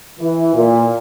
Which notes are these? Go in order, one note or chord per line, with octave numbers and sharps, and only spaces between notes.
E3
A#2